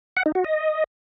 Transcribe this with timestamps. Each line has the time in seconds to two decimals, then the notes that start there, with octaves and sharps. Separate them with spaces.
0.17 F#5
0.26 D#4
0.35 F#4
0.44 D#5